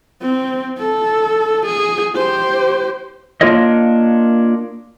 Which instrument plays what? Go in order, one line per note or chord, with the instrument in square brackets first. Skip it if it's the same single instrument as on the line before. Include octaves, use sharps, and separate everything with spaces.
[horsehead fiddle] C4
A4
G#4
G4 C5
[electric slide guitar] A#3 D4 F4 A#4 C#5 D#5